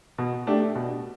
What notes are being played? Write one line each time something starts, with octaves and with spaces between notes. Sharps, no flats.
B2
A3 D4 G4
B2